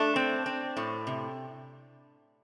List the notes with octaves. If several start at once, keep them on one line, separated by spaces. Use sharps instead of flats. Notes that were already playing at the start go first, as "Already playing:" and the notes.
Already playing: A3 D4
C4
C4
A2
C3